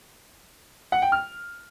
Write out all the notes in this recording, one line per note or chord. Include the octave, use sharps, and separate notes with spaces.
F#5
G5
F6